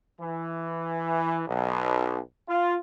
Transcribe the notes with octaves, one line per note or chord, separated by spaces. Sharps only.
E3
B1
F4